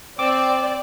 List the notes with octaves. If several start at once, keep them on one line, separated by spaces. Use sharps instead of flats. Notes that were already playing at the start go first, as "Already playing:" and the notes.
C4 D5 D6